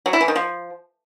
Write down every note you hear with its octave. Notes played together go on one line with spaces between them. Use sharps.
F#3
E4
E3
D#3
F3